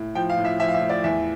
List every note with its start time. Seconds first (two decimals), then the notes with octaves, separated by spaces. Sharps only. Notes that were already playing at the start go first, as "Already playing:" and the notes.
Already playing: A2
0.15 F3 G5
0.30 F5
0.37 A2
0.45 E5
0.60 F3 E5
0.68 F5
0.74 E5
0.82 A2
0.89 D5
1.04 E2 E5